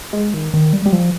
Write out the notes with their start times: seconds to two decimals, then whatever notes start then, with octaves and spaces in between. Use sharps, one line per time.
0.13 G#3
0.34 D#3
0.54 D#3
0.73 G3
0.86 G3
0.92 F3